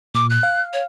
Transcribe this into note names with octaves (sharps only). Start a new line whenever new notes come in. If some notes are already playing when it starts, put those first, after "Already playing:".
A#2 D6
F#6
F5
C#5